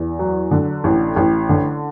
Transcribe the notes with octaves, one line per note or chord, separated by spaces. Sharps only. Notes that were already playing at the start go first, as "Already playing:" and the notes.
Already playing: E2
F#3
D3
A1
A1
D3